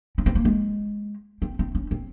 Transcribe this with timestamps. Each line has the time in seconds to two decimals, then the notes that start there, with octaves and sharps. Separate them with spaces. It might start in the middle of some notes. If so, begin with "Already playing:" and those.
0.18 C#4
0.26 C4
0.35 A#3
0.45 G#3
1.42 C4
1.59 C4
1.75 C#4
1.91 C4